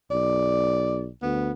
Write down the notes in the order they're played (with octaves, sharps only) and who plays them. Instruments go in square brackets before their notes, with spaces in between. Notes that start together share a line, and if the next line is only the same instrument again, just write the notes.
[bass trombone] B1 [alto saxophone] D5
[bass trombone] D2 [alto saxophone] B3